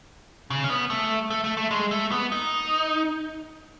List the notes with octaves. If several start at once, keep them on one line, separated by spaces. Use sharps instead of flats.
C#3
C#4
B3
A3
A3
A3
A3
G#3
A3
B3
D#4